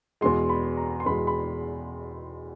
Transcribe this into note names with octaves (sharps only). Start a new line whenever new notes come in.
E2 B2 G#3 C6
B5
A#5
C6
E2 B2 G#3 B5
B5